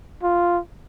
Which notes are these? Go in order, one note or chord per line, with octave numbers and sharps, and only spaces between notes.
F4